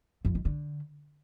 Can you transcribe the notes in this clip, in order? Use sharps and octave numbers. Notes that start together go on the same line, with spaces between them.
F2
D#3
D3